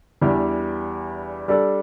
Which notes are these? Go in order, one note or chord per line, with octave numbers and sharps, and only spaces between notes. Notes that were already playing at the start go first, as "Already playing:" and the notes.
E2 E3 G3 D4
G3 D4 A4 D5